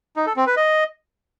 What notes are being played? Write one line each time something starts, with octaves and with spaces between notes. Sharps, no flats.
D#4
A4
C4
B4
D#5